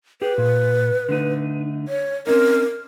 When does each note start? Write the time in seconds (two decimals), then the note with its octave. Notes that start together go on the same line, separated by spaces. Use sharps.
0.22 G4 G#4 B4
0.38 A#2
1.09 D3 A3 D#4
1.88 C#5
2.27 C4 C#4 D#4 A#4